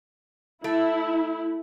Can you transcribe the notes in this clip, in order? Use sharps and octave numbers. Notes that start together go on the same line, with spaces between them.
A3 E4